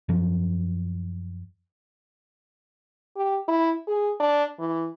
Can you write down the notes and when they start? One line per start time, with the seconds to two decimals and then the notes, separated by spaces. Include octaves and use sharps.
0.09 F#2 F3
3.16 G4
3.48 E4
3.87 G#4
4.20 D4
4.59 E3